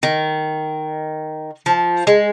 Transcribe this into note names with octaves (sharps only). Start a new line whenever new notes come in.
D#3
F3
G#3